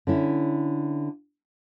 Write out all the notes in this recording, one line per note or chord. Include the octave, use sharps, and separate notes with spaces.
D3 C#4 E4